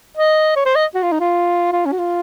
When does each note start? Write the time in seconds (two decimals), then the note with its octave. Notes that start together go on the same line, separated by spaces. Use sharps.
0.18 D#5
0.56 C#5
0.66 C5
0.75 D#5
0.95 F#4
1.03 F4
1.12 D#4
1.20 F4
1.73 F4
1.86 C#4
1.92 F#4
1.99 F4